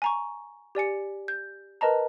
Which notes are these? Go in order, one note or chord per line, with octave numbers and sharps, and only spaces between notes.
G#5 A#5 C#6
G4 D5 G#5 C#7
G6
A#4 B4 D#5 A5 A#5